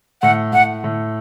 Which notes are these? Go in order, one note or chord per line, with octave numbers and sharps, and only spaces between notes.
A2 F#5
A2 F#5
A2